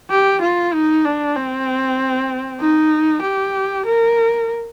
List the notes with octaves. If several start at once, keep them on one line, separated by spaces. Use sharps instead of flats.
G4
F4
D#4
D4
C4
D#4
G4
A#4